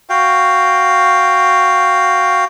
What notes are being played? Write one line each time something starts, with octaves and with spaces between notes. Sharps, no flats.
F#4 F5 G5